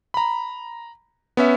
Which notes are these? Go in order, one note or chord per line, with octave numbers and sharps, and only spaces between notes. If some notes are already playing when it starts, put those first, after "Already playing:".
A#5 B5
B3 C#4 E5